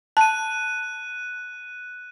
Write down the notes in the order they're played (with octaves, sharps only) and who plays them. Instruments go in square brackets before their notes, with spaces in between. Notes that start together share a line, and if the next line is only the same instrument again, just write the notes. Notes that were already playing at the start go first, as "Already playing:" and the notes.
[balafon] A5 [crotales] F#6 D#7